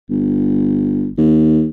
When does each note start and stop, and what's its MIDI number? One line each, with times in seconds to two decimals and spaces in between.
0.10 1.09 31
1.18 1.68 39